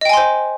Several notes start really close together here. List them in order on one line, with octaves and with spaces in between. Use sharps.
D#5 G5 G#5 C6 C5